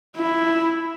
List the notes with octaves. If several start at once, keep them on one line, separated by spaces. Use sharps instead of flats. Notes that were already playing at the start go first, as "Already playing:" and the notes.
E4